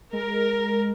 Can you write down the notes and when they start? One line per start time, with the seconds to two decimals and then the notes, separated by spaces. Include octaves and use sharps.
0.13 G#3 A#4